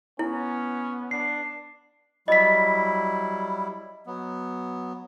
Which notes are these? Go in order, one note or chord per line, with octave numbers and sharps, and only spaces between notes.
B3 C#4 E4
D4 C7
F#3 G3 E4 D#5 B6
F#3 B3